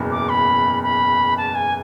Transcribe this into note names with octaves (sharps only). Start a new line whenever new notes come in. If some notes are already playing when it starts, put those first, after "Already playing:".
Already playing: F#1 E2 B2
D6
B5
B5
A5
G#5